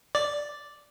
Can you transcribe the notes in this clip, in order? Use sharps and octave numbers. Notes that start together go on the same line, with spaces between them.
D5